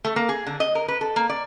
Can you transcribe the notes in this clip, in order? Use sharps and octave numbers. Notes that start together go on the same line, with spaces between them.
A3
A#3
G#4
D3
D#5
A#4
B4
A4
A#3
D5